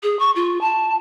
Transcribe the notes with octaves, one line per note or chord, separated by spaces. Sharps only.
G#4
C#6
F4
A5